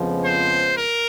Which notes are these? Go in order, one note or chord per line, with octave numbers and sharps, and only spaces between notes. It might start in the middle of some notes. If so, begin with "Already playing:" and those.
Already playing: F2 C#3 F3 G#3 B3
C5
A#4